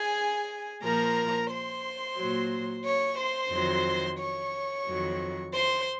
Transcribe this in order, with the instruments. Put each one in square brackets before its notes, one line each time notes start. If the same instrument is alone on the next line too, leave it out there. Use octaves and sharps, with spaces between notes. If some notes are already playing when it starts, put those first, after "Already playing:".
Already playing: [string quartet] G#4 G#5
A#2 F3 A#4 A#5
C5 C6
A#2 F#3
C#5 C#6
C5 C6
F2 D#3 F#3
C#5 C#6
F2 D#3 F#3
C5 C6